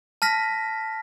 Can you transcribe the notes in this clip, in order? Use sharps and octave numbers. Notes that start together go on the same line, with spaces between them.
A5 F6 A#6 B6